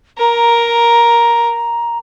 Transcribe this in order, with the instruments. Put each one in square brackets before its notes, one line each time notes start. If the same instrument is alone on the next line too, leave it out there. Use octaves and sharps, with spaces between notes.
[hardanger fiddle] A#4 [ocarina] A#5